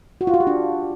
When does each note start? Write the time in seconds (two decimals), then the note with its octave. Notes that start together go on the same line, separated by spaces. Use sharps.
0.21 F#4
0.27 F4
0.34 F#4
0.40 G4
0.47 D4